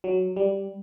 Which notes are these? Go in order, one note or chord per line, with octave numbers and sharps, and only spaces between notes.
F#3
G3